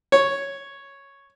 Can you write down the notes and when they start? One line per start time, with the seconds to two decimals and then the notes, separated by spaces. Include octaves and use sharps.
0.12 C#5